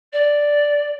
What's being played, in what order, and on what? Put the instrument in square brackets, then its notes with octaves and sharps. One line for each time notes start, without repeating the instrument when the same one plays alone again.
[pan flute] D5